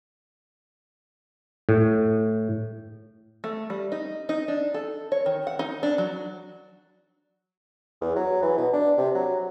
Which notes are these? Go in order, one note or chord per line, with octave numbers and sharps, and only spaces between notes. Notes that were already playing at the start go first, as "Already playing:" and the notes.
A2
A3
G3
D#4
D#4
D4
A4
C#5
D#3
F#5
D#4
D4
F#3
E2
F#3
E3
B2
D4
C3
F#3